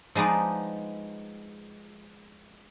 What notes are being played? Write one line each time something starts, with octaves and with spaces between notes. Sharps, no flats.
F3 G#3 B3 D#4 D5